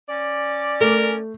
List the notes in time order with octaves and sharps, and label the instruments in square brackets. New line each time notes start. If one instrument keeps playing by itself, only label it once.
[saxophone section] C#4 D5
[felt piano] A3 [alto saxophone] A#4